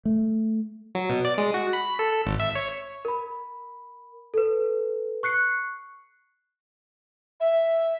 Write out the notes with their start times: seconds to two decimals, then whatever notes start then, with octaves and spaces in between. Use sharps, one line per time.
0.05 A3
0.95 F#3
1.10 B2
1.25 D5
1.38 G#3
1.54 F#4
1.73 B5
1.99 A4
2.12 A4
2.26 G#1
2.40 E5
2.55 C#5
3.05 A#4 B5
4.34 A4 B4
5.23 C#6 F#6 C7 C#7
7.40 E5